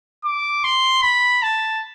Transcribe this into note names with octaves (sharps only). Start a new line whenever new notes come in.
D6
C6
B5
A5